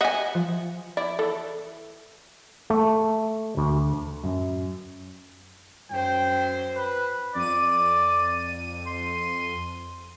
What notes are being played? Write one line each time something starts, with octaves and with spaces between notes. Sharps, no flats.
D#5 E5 F#5 G#5
F3
E4 D5
E3 A4
A3
D2
F#2
F#2 C5 G5
B4
F2 D5 D#7
C6